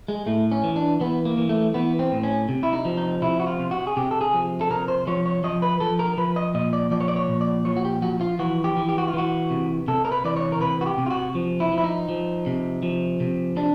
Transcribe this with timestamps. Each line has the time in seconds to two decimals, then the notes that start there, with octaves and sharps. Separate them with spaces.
0.08 G#3
0.26 A2 A3
0.52 C#4
0.63 E3
0.76 D4
1.00 E3 B3
1.25 A#3
1.38 E3
1.49 A3
1.74 E3 B3
1.99 C4
2.12 A2
2.23 C#4
2.49 C3
2.63 E4
2.73 D#4
2.85 F3
2.97 D#4
3.22 C3 E4
3.40 F#4
3.47 F4
3.59 C3
3.71 F#4
3.87 G#4
3.97 C3 G4
4.11 A4
4.21 G#4
4.33 F3
4.61 A4
4.70 C3 A#4
4.88 C5
5.07 F3 C#5
5.26 C#5
5.44 F3 D#5
5.62 B4
5.80 F3 A4
5.99 A#4
6.17 F3 B4
6.36 D#5
6.54 A#2 D#5
6.73 D5
6.91 F3 D5
7.01 C#5
7.08 D5
7.16 C#5
7.28 A#2
7.41 D5
7.65 F3 C#5
7.77 F#4
7.85 G4
8.02 F3 F#4
8.21 F4
8.39 E3 F#4
8.64 G4
8.77 E3
8.89 G4
8.98 F#4
9.08 F4
9.14 E3 F#4
9.50 C3
9.88 C3 A4
10.05 A#4
10.12 B4
10.24 E3 D5
10.36 C#5
10.52 A#4
10.61 C3 B4
10.81 F#4
10.86 G4
10.98 C3
11.06 F4
11.10 F#4
11.35 F3
11.60 E4
11.72 F3
11.78 E4
11.84 D#4
12.09 F3
12.46 C3
12.83 F3
13.20 C3
13.56 C3 D4